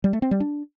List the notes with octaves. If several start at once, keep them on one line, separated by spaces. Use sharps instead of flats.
G3
A3
C4
G3
D4